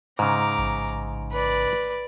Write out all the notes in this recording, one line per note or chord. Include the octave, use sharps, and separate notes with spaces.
G#2 C#3 A#5 D6
A1
B4 D5